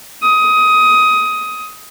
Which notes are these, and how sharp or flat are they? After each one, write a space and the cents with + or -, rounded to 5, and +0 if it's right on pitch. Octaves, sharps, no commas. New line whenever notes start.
D#6 +15